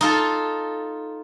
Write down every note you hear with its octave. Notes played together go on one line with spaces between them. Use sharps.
D#4 F4 A4